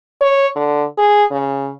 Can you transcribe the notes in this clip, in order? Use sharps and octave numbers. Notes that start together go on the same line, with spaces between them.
C#5
D3
G#4
C#3